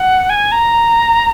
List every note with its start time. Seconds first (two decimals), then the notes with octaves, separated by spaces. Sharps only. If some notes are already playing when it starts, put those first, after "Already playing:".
Already playing: F#5
0.30 G#5
0.52 A#5